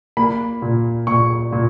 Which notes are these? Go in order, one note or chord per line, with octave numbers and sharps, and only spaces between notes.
A#3 B5
A#2
A#2 C#6
A#2